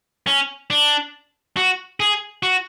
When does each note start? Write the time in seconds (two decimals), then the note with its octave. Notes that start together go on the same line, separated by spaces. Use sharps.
0.27 C#4
0.70 D4
1.57 F#4
2.00 G#4
2.43 F#4